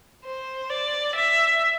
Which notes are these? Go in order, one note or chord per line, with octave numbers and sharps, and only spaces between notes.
C5
D5
E5